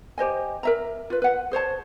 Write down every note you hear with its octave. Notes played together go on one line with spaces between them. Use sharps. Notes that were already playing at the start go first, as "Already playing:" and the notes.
G4 C5 D#5 G#5
A#4 E5 A#5
F4 B4
B4 F#5
G#4 C5 C#5 A5